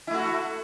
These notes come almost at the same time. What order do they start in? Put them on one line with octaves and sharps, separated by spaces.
E4 A3 F#4